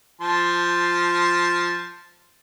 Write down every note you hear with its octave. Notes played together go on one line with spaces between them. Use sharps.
F3 A5 C6